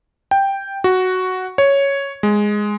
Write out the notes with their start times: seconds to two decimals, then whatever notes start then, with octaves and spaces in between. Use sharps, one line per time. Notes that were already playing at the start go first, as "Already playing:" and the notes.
0.31 G5
0.84 F#4
1.58 C#5
2.23 G#3